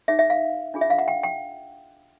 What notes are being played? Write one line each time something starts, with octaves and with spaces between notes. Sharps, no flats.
D#4 G#4 C#5 E5
E5
F5
D4 F4 G#4
E5
F5
F#5
G5
G5